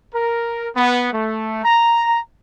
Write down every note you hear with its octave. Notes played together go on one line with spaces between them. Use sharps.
A#4
B3
A3
A#5